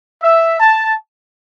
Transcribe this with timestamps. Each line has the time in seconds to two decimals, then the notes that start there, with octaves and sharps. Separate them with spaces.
0.23 E5
0.60 A5